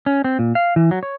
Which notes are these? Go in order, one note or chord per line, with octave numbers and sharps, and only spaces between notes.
C#4
C4
A#2
F5
E3
F#3
C#5